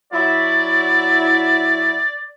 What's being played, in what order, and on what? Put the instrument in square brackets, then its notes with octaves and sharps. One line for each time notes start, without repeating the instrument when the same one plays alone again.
[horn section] F#3 E4 [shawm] D5